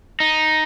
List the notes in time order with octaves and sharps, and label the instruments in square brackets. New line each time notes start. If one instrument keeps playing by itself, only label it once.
[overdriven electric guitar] D#4